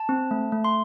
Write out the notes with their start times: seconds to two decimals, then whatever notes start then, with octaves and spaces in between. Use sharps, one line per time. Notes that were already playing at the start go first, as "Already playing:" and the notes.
Already playing: A5
0.09 C4
0.31 A3
0.52 A3
0.64 C6